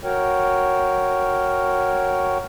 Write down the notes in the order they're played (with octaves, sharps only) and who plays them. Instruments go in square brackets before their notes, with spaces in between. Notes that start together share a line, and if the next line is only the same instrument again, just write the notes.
[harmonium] F#4 A#4 C#5 G5